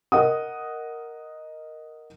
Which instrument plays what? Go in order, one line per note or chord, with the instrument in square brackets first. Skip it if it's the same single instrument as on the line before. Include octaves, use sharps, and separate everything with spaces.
[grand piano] A#4 D#5 F#5 D#6